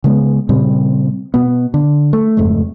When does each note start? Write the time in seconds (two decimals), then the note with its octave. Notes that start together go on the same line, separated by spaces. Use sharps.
0.04 C#3 G#3 B3
0.49 A#2 C#3 G3 C4
1.34 B2 B3
1.74 D3
2.13 A3
2.37 F#1 F2 G#2 A3